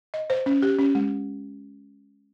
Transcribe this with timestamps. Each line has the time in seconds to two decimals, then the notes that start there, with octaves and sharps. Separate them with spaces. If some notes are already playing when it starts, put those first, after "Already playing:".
0.14 D#5
0.30 C5
0.46 C#4
0.63 G4
0.79 C#4
0.95 G#3